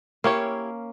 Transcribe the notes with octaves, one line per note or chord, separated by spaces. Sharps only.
A#3 C#4 E4 G4 C#5 F5